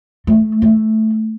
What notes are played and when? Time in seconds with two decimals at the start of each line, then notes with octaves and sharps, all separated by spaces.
0.27 A3
0.62 A3